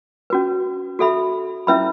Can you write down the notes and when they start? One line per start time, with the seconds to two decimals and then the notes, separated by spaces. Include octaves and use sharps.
0.30 C#4 F#4 B4
0.99 F#4 A4 E5 B5
1.67 C#4 E4 B4 E5 B5